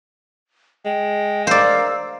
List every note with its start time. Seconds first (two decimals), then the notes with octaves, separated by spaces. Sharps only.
0.86 G#3 G5
1.47 A#4 C5 D5 F5 E6